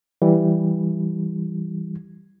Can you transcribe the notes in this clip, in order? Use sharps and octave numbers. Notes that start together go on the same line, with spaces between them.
E3 G3